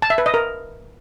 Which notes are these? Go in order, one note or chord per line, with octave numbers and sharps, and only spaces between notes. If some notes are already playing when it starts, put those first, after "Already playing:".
A5
E5
B4
D#5
A#4